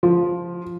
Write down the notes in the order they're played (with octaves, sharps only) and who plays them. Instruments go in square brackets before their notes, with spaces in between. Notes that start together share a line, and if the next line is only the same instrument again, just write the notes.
[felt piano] F3